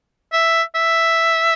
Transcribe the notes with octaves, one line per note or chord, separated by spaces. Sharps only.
E5
E5